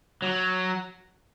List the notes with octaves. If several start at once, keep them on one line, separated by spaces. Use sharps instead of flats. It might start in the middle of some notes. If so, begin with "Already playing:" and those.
F#3